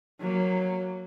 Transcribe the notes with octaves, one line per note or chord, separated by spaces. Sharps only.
F#3 A#3